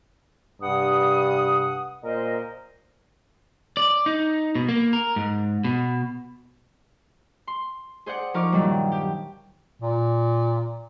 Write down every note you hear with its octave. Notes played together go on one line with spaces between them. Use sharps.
G2 C3 F#5 D#6
A#2 A#4 C5 D#5
D5
D#4
B2
A#3
A#4
G#2
B2
C6
G#4 C5 D5 F#5
F3 D#4 A#4 C#6 D6 F6
G2 A#2 D#3 F#3 G3
G4
A#2